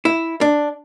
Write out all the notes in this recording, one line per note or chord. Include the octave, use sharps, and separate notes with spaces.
E4
D4